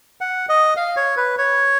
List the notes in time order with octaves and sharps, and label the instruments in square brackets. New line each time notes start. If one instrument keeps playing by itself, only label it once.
[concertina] F#5
D#5
F5
C#5
B4
C#5